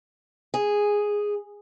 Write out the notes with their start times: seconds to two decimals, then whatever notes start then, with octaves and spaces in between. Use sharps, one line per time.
0.54 G#4